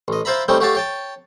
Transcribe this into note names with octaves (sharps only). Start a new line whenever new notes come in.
A1 D#5
E4 F4 C5 E5 A#5 B5
G3 A3 C4 C#4 D#4
A3 F#4 G4 C#5 F5 A5
C#5 G5 A5